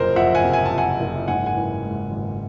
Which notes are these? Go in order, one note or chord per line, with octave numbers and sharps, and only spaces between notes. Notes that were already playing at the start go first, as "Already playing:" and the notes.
Already playing: F#1 F2 C3 F3 A#4 C5
F2 E5 F#5
F#5 G#5
C3
G#5
A5
F3
F#5 G#5
F#1
G#2 F#5 G#5
F#5 G#5
E3
G#3
G#1